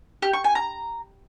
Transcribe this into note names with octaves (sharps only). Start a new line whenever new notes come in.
G4
C#6
G#5
A#5